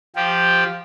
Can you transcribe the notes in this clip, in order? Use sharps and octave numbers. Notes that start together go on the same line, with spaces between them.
F3 G4